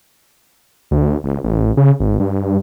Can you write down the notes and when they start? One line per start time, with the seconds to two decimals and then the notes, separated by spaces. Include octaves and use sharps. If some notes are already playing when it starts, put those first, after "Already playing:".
0.91 D2
1.24 C#2
1.44 A1
1.77 C#3
2.00 G#1
2.20 G2